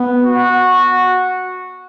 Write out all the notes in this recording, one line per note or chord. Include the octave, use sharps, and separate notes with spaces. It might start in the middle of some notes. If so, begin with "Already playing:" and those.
Already playing: B3
F#4